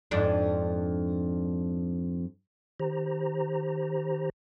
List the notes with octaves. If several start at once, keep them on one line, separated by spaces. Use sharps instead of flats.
F2 G#2 D4
D#3 G4 C5 A#5